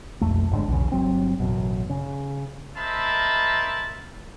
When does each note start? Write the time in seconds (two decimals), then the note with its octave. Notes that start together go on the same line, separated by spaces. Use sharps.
0.21 D#1 B1 F2 A3
0.51 G1 G#2 D3
0.68 B1 E2 C#3
0.92 G1 F#3 C4
1.40 A1 F#2 B2
1.89 C#3
2.77 A#4 C5 D#5 E5 A5 B5